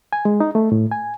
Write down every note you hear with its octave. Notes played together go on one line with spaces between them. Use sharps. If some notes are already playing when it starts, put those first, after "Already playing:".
G#5
G#3
D#4
A3
A2
G#5